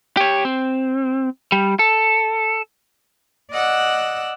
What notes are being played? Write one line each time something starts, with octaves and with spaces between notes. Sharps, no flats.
G4 C#5
C4
G3
A4
D5 D#5 F#5 E6 F#6